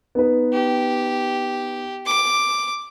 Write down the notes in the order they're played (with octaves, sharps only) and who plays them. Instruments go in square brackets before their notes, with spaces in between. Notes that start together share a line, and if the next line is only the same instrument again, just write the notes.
[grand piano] B3 D#4 B4
[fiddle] G4
D6